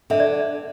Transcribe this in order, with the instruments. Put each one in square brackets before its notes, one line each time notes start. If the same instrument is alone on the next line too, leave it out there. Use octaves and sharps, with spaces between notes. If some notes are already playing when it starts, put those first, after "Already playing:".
[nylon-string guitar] D3 [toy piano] E5
[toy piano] D5